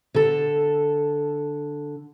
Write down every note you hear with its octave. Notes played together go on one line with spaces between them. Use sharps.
D3 A4